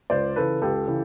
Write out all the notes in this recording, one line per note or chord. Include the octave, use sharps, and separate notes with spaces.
C#2 C5 D5
C#3 E3 A4 B4
C#2 G4 A4
C#3 E3